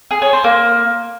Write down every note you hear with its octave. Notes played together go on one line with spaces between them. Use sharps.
G#4
C#5
C5
A#3